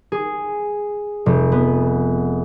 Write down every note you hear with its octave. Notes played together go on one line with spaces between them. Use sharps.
G#4
F1
B3